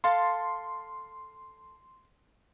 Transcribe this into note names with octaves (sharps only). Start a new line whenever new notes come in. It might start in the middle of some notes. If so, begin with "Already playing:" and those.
A4 F5 A5 C6